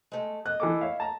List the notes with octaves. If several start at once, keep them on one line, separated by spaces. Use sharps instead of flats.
G#3 A3
D#5 F#6
E3 A4 D6
C#5 E5 F5
A5 A#5